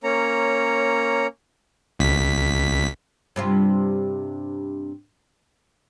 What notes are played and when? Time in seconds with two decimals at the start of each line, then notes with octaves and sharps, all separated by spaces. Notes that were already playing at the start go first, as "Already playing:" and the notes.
0.04 A#3 C#4 C#5 A#5
1.99 C#2 B6
3.36 G2 C3 F4